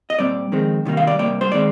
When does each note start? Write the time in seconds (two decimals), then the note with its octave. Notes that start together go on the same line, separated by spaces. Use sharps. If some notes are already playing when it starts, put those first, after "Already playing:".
0.10 D#5
0.19 A#2 G3 C4 D5
0.52 F2 D#3 G#3 C4
0.85 C3 D#3 G3 A#3
0.97 F5
1.07 D5
1.19 C3 G3 A#3 D5
1.41 C5
1.52 D#3 G#3 C4 D5